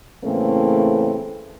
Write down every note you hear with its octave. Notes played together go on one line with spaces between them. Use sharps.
A2 C#3 E3 A3 A#3 C4